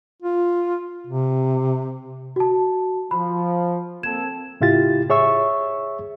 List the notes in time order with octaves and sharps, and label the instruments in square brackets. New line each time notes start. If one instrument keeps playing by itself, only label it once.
[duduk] F4
C3
[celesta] F#4 A5
[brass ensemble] F3 [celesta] B5
[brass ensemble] A#3 C4 A4 [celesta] G#6 E7
[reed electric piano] A2 C#3 E4 F4 G4 A6
G#4 C#5 E5 C#6 E6